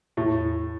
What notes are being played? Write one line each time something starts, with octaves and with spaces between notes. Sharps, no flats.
E2 A2